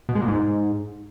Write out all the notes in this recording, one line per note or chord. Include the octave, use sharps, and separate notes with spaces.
B2
G#3
A#2
G#2